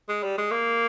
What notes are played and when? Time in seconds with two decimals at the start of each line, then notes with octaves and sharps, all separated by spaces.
0.09 G#3
0.23 G3
0.38 G#3
0.52 A#3